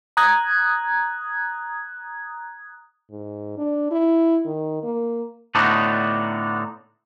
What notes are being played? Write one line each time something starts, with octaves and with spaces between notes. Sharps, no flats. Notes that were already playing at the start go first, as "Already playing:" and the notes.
A#5 D#6 F#6 G#6
G#2
D4
E4
D#3
A#3
A2 D3 B3 D4 D#4 F#4